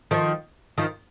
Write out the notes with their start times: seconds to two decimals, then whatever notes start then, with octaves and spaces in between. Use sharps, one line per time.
0.11 D#3 F3
0.78 D#3 F3